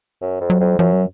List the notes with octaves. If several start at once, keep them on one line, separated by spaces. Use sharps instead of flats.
F#2
F2
F#3
F2
F#2 F3
F#3